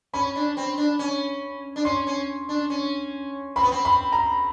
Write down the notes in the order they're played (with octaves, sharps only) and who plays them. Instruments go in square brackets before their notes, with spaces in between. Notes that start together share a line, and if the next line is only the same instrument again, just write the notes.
[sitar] C#4 [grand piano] B5
[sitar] D4
C4
D4
C#4
D4
[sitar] C#4 [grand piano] C6
[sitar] C#4
D4
C#4
[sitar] C4 [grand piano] B5
[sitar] B3
C4
[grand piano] B5
A#5